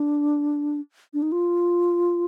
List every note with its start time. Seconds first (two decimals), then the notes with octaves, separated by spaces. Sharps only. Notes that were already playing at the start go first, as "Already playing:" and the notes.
Already playing: D4
1.14 D4
1.22 D#4
1.32 F4